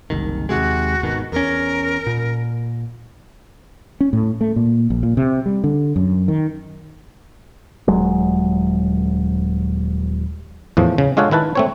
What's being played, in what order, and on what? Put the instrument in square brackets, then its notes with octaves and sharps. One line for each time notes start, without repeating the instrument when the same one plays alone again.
[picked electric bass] F#1 C2 D#3
[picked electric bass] D#2 C3 G#3 [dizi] F#4
[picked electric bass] G#1 B2 D#3
[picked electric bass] E2 C#4 [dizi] A#4
[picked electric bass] A#2
[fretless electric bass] C#4
A2
A3
A#2
A#1
A#2
C3
G3
D3
F#2
D#3
[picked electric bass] D#1 F#3 G#3
[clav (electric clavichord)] E2 A2 F3
C#3
G#3 D4 F4 A4 C#5 F#5
D#3 E4 B4 A5
A3 C4 C#5